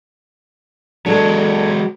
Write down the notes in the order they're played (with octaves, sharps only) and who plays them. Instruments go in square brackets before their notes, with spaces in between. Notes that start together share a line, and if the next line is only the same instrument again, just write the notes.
[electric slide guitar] F#3 G#3 [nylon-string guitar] D4 A4